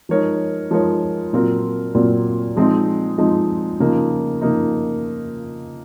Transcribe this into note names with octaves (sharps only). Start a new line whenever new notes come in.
F3 G#3 D#4 A#4 C#5
F3 G#3 D#4 A#4 C#5
A#2 F#3 C4 F4 A#4
A#2 F#3 C4 F4 A#4
F3 G#3 C4 D#4
F3 G#3 C4 D#4
C#3 F3 A#3 D#4
C#3 F3 A#3 D#4